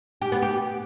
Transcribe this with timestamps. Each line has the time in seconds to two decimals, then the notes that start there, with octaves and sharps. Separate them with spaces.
0.22 G4
0.32 B3
0.42 G4